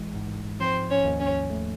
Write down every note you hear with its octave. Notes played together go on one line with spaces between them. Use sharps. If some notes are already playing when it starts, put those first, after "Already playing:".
Already playing: A1 E3 G#3
G#2
F3 C4 C5
C#4 C#5
D#2
C#4 C#5
A3